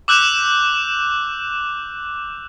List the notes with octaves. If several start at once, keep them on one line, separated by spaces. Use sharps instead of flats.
D6 E6 F#6 G6 E7 F7